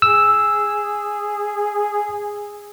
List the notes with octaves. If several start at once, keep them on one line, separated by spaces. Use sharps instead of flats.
G#4 E6